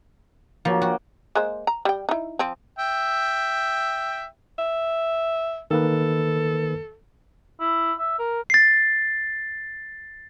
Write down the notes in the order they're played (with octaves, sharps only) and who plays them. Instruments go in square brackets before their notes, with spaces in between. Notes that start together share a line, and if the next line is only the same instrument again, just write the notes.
[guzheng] F3 [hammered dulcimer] F#3 A#3
[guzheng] F#4 [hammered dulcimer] G5
[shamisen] G#3 A#3 C5
A#5
G3 G5
D#4 E4
F3 C4
[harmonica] E5 G5
[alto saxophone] E5
[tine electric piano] D#3 A#3 B4 [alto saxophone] A4
[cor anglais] E4
E5
A#4
[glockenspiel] A6 C7